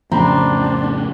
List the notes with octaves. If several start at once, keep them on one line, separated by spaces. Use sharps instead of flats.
F2 A2 C#3 C4 D4 A#5 B5